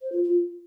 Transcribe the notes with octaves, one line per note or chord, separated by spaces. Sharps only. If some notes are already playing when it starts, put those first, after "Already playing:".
C5
F4
F4